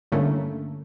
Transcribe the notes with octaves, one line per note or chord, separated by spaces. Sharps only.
G2 D3 A3 A#3 C#4 E4